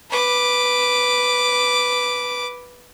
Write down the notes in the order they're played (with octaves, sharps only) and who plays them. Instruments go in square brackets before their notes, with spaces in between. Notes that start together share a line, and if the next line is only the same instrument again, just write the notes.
[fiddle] B4 D6